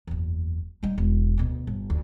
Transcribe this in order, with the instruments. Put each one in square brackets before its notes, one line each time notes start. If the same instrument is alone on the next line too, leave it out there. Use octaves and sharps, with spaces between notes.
[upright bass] F#1 E2
G3 D#4
E1
D2 B2
G1
D2